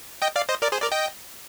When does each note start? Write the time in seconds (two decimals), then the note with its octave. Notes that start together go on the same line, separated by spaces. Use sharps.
0.22 D#5 G5
0.36 D5 F5
0.49 C5 D#5
0.62 A#4 D5
0.72 G#4 C5
0.82 A#4 D5
0.92 D#5 G5